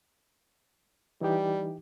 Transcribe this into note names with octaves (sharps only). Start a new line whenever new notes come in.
E3 G3 D#4 G4